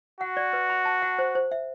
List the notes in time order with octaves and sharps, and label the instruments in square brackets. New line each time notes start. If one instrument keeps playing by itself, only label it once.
[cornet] F#4 [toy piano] F#5
[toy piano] D5
B4
B5
A5
F#5
C5
C5
E5